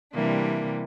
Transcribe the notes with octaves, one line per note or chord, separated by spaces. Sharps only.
C3 E3 G3 A#3 D4